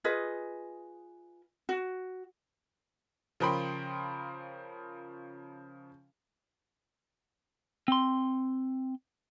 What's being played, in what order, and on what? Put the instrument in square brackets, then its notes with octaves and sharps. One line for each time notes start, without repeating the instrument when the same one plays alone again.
[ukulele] F4 G#4 B4 D#5
F#4
[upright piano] C#3 F3 A#4 G5 B5 C6
[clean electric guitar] C4 C6